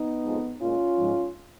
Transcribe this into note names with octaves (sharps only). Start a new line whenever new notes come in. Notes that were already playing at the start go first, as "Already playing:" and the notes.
Already playing: B3 D#4
F2 F3 G#3
A#2 G#3 C#4 F4
G#2 F3 G#3